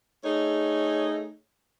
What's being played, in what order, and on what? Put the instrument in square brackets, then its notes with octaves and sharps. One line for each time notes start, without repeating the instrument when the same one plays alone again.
[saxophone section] A3 D#4 G#4 C#5